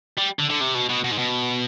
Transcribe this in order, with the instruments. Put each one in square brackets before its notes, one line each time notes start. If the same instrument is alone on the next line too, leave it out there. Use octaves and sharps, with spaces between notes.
[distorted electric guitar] G3
D3
D3
C3
B2
B2
B2
G#2
B2